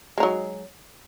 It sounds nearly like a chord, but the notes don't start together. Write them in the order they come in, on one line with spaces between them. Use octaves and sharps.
G#3 D#4 F#3